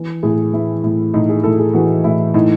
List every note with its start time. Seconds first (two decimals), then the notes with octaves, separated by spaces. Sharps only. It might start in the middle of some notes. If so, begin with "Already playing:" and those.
Already playing: E3
0.23 A2 G#4
0.53 E3 E4
0.84 A2
1.14 A2 D#4
1.29 G#4
1.44 A2 A4
1.59 G#4
1.74 E3 F#4
2.04 A2 E4
2.34 A2 D#4